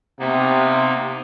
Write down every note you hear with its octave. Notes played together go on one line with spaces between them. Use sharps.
C3 A#3 B3 D#4